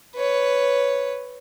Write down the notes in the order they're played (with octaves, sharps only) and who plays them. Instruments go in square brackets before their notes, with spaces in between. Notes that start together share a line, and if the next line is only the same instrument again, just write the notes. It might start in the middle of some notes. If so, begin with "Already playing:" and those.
[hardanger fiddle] B4 C#5